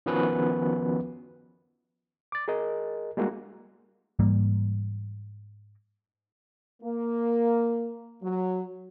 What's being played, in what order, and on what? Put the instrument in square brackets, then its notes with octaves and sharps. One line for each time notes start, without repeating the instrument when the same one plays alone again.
[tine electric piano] D#3 F3 B3 C#4 F#4 B4
[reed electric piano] D6 A6
G#4 A#4 D#5
G3 G#3 A#3 D4 F#4
[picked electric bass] G#2 E3 G3 A#3
[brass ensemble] A#3
F#3